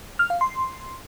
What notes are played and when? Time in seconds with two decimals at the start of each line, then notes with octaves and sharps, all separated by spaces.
0.19 F6
0.30 F5
0.41 C6